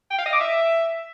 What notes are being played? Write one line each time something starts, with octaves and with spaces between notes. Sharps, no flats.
G5
F5
D#5
D6
E5